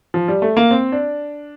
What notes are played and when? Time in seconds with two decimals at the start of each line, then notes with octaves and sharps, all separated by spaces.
0.14 F3
0.28 G3
0.42 A3
0.57 A#3
0.71 C4
0.92 D4